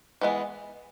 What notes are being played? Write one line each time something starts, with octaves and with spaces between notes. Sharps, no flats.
E3 G#3 B3